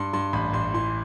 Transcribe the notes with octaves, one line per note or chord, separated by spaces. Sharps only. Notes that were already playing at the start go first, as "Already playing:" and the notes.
Already playing: G2 C6
G2 C6
A1 B5
A1 C6
E3 C6